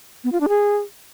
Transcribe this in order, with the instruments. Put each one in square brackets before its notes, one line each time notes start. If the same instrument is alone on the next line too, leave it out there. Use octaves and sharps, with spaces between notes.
[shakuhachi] B3
F4
D4
G#4